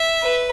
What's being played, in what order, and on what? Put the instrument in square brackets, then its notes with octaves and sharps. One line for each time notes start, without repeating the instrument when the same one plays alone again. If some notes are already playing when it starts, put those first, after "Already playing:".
Already playing: [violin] E5
[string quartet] B4